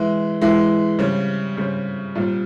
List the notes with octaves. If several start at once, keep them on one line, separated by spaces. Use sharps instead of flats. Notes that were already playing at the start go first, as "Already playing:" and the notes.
Already playing: E3 G#3 E4
E3 G#3 E4
C#3 G3 C4
C#3 G3 C4
A#2 G3 C4